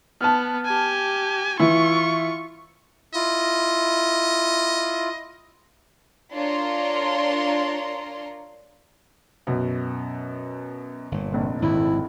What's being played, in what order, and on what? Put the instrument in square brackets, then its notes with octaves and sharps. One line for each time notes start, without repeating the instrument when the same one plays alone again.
[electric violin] B3 [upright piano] A5 F6
[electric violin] G4 G#5
[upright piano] E3 E4 [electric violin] F4 C#6
[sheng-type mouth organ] E4 F4 [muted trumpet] D#5
[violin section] D4 F4 A#4 C#5 A#5 C6
[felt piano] F#2 B2
[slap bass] G1 A#2
[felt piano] F1 A#1
[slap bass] G#1 F2 [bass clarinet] E4